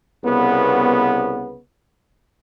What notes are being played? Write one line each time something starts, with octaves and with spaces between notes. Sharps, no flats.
C2 C#3 B3